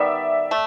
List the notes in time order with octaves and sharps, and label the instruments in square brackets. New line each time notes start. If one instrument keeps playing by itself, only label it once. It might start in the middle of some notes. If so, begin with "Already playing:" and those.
Already playing: [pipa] D#3 G3 B3 [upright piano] D5 E5
[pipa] A3